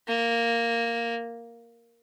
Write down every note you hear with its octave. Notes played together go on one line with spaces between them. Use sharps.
A#3